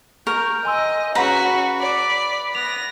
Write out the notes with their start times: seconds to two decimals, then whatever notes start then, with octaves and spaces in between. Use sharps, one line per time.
0.27 A#4 G5 C#6
0.65 D#5 G#5 C6 E6
1.15 C#4 F#4 G#4 B4 F#5 A#5 B5 C#6
1.46 B5
1.80 D5
2.55 B3 A#6 F7